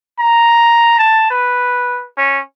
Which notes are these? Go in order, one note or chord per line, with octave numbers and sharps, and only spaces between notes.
A#5
A5
B4
C#4